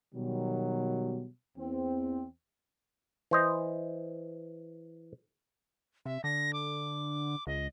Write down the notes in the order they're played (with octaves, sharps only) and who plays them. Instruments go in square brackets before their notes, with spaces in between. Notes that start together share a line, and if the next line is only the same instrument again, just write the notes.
[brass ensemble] B2 D#3 F#3 G3
E2 C4
[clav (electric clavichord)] E3 C5 D#5
[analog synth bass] C3 [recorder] E5
[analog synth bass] D3 [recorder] A#6
[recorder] D6
[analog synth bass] C#2 [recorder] D#5